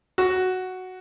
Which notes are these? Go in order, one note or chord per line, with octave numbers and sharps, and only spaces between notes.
F#4